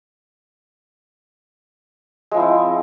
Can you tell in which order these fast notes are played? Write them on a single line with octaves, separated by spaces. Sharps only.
G#3 F3 E4 C4